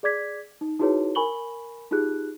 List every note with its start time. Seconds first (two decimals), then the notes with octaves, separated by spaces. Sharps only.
0.03 G#4 D5 D6 G#6 B6
0.61 D#4
0.79 D#4 E4 F#4 G#4 B4 C#5
1.15 A#4 G#5 B5 C#6 F#7 G7
1.91 D#4 F4 G4 G#4 F#6